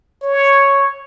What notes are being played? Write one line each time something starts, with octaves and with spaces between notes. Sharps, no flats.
C#5